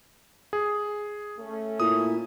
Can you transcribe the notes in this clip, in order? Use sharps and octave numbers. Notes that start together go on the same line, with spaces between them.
G#4
A3 C#4
A#2 E4 D#6